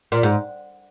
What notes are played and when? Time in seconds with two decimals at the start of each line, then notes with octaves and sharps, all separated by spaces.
0.12 A#2
0.23 G#2